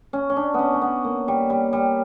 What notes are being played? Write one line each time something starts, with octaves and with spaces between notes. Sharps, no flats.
C#4
C#4
D4
B3 C#4
C#4
B3
A#3
G3
G3
G3